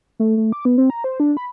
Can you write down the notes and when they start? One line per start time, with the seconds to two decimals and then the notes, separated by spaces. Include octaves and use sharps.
0.19 A3
0.37 A3
0.52 D6
0.65 B3
0.78 C4
0.90 A#5
1.04 C5
1.20 D4
1.37 B5